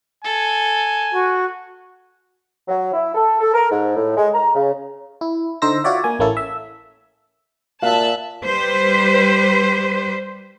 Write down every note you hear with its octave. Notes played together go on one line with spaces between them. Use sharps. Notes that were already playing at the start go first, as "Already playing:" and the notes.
A4 G#5
F#4
F#3
E4
A4
A4
A#4
G#2
A2
G#3
A#5
C#3
E4
D3 D#4 C5 E6 A#6
F4 F#4 C#5 D5 E5
A#3 G#5
A1 A#3 C#4 E4 A4
E5
A#2 E5 F5 A5 F#6
G3 B4 C5